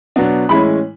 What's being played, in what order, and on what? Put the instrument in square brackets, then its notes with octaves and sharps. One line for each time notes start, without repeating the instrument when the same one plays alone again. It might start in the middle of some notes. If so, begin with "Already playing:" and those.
[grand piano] B2 F#3 B3 D4
A2 E3 G#3 C#4 E4 B5